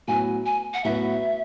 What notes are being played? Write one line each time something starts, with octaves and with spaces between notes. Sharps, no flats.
A2 F#3 B3 F#4 B4 G#5
G#5
F#5
A2 F#3 B3 F#4 B4 E5